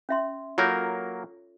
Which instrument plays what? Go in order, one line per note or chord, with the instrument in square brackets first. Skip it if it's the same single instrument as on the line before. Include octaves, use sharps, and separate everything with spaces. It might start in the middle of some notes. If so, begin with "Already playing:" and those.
[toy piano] C#4 E5 C6
[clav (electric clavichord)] F#3 A#3 A#4 [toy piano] F4 A4 C#5